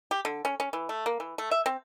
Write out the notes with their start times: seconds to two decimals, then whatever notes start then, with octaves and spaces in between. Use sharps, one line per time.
0.11 G4
0.25 D3
0.45 C#4
0.60 C#4
0.73 E3
0.89 A3
1.06 A#3
1.20 E3
1.38 A3
1.51 E5
1.66 C4